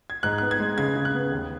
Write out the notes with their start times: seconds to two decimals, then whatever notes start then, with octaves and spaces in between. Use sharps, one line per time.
0.10 G#6
0.23 G#2 F#6
0.38 B3 F#6
0.51 G#6
0.60 G#3
0.78 C#3 G#6
0.96 C#3
1.05 F#6
1.14 B3
1.32 D#2